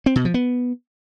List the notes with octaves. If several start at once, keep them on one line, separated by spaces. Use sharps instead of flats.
C4
B2
F3
B3